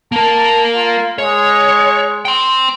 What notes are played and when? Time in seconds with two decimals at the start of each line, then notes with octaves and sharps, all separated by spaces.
0.12 A#3 A#4 A5
0.76 F4
1.18 G#3 C#5
2.25 G5 C6